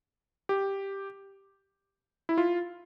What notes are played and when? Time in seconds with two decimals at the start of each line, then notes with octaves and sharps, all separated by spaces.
0.49 G4
2.29 E4
2.38 F4